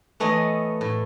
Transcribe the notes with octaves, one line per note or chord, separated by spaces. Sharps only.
E3 A3 B3 C#5 D#5
A2